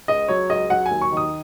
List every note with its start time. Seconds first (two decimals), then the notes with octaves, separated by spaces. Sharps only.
0.08 C#2 D#5
0.28 F#3 C#5
0.49 C#2 D#5
0.70 F#3 F#5
0.86 G#5
0.91 D#2
1.01 C#6
1.12 D#3 D#6